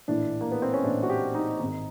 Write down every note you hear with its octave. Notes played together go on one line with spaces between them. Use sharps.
A#1 A2 E3 D4
A#3
B3
C4
C#4
A#1 A2 E3 D4
F#4
G4
D#4
G#1 G#2 D#3 D#4